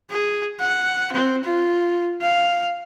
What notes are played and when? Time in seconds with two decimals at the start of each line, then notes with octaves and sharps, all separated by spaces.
0.10 G#4
0.60 F#5
1.13 C4
1.44 F4
2.22 F5